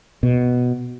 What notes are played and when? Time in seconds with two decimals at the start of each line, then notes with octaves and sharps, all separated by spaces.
0.23 B2